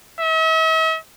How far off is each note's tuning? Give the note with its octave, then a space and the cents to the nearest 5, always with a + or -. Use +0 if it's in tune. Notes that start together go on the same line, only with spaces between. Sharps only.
E5 -45